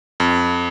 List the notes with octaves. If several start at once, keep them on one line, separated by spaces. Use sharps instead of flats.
F2